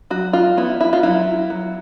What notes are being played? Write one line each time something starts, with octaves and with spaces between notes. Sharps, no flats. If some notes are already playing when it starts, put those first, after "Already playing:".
F#3 F#4
F4
B3 E4
E4
F4
F#3 E4
F#3